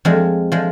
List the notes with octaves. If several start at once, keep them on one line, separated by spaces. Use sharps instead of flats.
F2 F3 G#3
F3 G#3